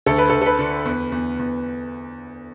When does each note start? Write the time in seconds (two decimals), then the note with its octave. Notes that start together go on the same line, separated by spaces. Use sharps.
0.06 D2 A4
0.18 B4
0.29 A4
0.33 D2
0.42 A4
0.46 B4
0.59 D3
0.85 E2
1.12 E2
1.39 E2